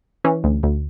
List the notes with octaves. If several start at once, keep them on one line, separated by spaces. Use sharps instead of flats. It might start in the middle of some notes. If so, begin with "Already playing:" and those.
E3 C#4
D2
D2